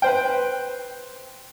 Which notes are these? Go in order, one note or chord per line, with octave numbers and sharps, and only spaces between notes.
B4 C5 G5